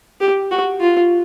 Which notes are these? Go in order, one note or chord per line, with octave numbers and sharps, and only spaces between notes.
G4
F#4
F4